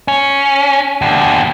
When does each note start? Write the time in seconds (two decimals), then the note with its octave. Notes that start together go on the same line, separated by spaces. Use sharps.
0.08 C#4
1.02 D#2 D3